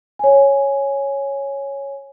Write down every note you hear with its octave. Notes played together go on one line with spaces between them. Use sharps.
C#5 G#5